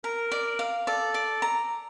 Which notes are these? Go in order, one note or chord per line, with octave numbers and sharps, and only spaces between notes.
A#4 A#5
D5
F5
A4 D5
D5
A#5